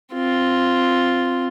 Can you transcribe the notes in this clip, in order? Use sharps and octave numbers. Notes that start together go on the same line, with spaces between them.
C4 F4